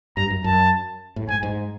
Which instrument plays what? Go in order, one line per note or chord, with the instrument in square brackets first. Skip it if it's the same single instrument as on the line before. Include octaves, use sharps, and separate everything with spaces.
[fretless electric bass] G2 [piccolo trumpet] A#5
[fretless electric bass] F#2
[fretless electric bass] F#2 [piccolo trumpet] A5
[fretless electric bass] A2
[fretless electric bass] G#2 [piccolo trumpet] G#5
[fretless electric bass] G#2